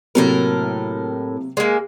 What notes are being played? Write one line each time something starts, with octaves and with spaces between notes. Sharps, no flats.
A2 C3 F#3 A#3 A4 A#4
G#3 A#3